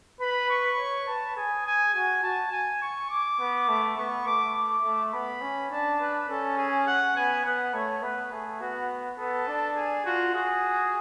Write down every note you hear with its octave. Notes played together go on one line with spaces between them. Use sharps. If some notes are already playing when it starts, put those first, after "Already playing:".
B4 B5
C#6
C#5
B4 A5
G#4 G#5
G#5
F#4 G#5
F#4 A5
G#5
C#6
D6
B3
A3
B3 C#6
A3 D6
D6
A3
B3 B5
C#4
D4 A5
B4
C#4 A4
G#4
F#5
B3 G#5
B3 F#5
A3 C#5
B3 B4
A3 G#4
B3 F#4
B3 A4
D4
G#4
F4 F#4
F#4 G#4